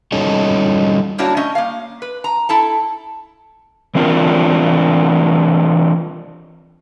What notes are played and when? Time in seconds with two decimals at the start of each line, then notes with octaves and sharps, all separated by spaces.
0.12 G3 C#4 D#4 A4 C#5 D#5
1.18 G3 A#3 D4 E4 F#4 C#5
1.37 A3 C#4 D#5
1.55 A#3 F5
2.02 B4
2.24 A#5
2.49 E4 A4 A5
3.95 E3 C4 D4 F4 A#4